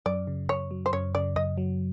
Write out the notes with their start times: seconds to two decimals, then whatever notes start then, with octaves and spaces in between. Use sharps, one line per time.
0.06 F#2 D5
0.27 C#3
0.49 F#2 C#5
0.71 F#3
0.86 C5
0.93 F#2 C#5
1.15 C#3 D5
1.36 F#2 D#5
1.58 F#3